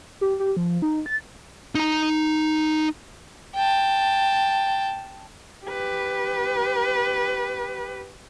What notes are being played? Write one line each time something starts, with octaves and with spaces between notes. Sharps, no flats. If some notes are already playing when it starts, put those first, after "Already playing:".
G4
G4
F3
D#4
A6
D#4 A#5
G5 A5
G4 B4